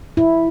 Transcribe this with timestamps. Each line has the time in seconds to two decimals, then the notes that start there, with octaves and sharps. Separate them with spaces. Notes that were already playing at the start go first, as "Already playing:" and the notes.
0.17 E4